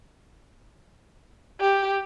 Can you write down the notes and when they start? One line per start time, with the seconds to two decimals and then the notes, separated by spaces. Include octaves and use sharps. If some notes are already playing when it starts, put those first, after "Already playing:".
1.60 G4